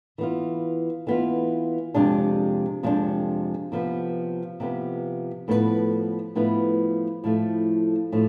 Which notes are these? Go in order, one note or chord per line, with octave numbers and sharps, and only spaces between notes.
E3 B3 F4
E3 B3 F4
F2 C3 G#3 D4
F2 C3 G#3 D4
C3 F3 B3
C3 F3 B3
A2 F3 B3 E4 B4
A2 F3 B3 E4 B4
A2 F3 A3
A2 F3